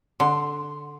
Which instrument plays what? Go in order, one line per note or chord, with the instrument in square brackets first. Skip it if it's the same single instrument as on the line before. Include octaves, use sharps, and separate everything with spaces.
[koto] D3 [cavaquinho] C6